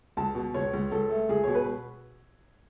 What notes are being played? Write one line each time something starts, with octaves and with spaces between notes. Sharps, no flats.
C#2 A5
B2
C#2 C#5
C#2
C#2 A4
A3
C#2 G#4
B2 C#5
B4